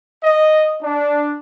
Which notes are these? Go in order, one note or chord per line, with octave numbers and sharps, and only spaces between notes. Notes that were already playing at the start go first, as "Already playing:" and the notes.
D#5
D4